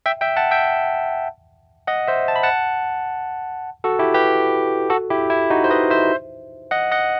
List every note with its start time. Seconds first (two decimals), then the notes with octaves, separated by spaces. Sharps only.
0.06 E5 G5
0.21 E5 G5
0.36 F#5 A5
0.51 E5 G5
1.87 D#5 F#5
2.08 C5 E5
2.28 A5
2.36 B5
2.43 F#5 A5
3.84 F#4 A4
3.99 E4 G4
4.14 G4 B4
4.90 F#4 A4
5.10 E4 G4
5.30 E4
5.50 D#4 F#4
5.64 C5
5.71 B4 D#5
5.90 C5 E5
6.71 D#5 F#5
6.91 D#5 F#5